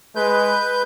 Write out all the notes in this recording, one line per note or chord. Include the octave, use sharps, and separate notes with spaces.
G#3 B4 G6